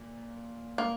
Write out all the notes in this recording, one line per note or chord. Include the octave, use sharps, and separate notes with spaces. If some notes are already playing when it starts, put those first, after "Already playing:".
Already playing: A#2
A#3